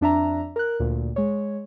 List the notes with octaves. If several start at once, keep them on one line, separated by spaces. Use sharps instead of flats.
F2 D4 E5 A#5
A#4 F#6
D2 A#2
G#3 C#5